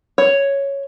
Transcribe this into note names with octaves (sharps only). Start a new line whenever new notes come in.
C#5